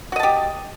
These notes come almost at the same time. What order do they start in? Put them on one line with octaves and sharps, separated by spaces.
F#4 D#5 A5 G4